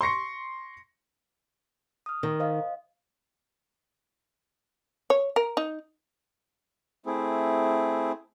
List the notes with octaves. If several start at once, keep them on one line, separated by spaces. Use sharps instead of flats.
C6 C#6 A#6 C#7
D#6 F6
D#3
C5 D#5 F5
C#5
A#4
D#4
A3 C4 E4 G#4